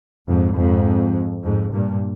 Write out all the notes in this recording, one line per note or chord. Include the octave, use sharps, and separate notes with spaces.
F2 G#2
F2 G#2
F2 G#2
G2 A#2